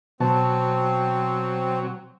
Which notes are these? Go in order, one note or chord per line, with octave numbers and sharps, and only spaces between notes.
B2 F#3 C4 A5